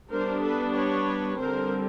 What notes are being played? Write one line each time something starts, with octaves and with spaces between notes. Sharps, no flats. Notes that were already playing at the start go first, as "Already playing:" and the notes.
G3 B3 D4 A#4 C5
A4 B4
B4 C#5
D3 G3 C4 A#4 C5